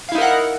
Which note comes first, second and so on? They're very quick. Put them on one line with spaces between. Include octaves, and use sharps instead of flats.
F5 E4 D#4 A#4 F#5